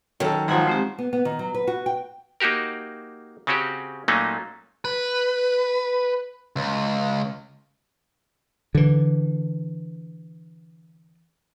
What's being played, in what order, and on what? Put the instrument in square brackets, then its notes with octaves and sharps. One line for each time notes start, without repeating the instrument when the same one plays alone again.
[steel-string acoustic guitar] D#3 F#3 [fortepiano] C#4 A4
[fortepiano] G#1 F3 [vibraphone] F4 F#5 A#5
[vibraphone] G#3 C4 G4
[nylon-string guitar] B3
B3
D#3
F#3
B4
F#4
G5
[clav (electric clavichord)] A#3 D#4 F#4 G4 A#4
C#3 C4 C#4 F#4 G4
A#2 F#3 A3 A#3 C#4 D#4
[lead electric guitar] B4
C#2
[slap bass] D3 E3